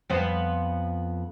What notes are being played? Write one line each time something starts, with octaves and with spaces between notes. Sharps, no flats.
F2 B3 C5